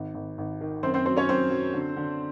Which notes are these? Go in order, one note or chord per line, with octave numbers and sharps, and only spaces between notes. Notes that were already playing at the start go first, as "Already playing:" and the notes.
Already playing: G#1
G#1
G#1
D#3
F#2 C4 C5
C4 C5
F#3 C4 C5
C#4 C#5
F#3 C4 C5
F#3
D3
D3